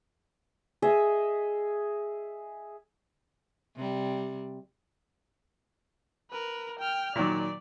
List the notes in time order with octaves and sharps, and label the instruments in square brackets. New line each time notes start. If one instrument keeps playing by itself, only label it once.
[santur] G#4 D#5 E5
[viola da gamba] C3 G3
[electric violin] A#4 B4
G5 F6
[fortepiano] A#2 D#3 F#3 [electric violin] D5